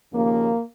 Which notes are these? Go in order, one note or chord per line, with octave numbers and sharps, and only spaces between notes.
D#2 C#3 F3 A#3